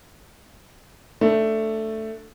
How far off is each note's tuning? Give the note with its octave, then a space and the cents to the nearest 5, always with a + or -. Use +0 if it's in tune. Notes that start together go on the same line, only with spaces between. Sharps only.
A3 +5 D4 +0